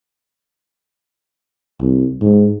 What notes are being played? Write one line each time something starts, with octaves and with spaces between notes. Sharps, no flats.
C2
G#2